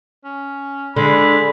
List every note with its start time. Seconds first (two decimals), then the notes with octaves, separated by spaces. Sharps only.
0.25 C#4
0.96 D3 G#3 B5